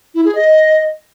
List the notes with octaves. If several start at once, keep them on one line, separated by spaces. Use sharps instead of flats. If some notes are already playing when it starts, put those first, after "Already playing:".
E4
G#4
D#5